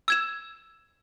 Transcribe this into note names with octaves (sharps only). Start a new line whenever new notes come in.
E6 G#6 E7